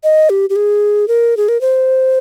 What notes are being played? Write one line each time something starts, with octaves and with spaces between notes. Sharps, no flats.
D#5
G4
G4
G#4
A#4
G#4
A#4
C5